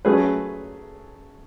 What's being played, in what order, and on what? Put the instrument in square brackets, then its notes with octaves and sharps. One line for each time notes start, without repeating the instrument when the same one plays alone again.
[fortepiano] F#3 A3 C#4 G#4 B4